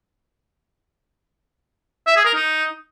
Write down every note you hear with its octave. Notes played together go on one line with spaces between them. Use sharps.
E5
G#4
A#4
D#4